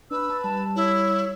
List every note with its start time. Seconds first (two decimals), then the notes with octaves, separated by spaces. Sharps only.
0.11 D4 B4 E6
0.30 A5
0.44 G3 A5
0.76 E4 C#5